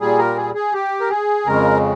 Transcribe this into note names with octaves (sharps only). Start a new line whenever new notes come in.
A#2 G3 G#4
A#4
G#4
G#4
G4
A#4
G#4
F2 C#3 G#3 A#4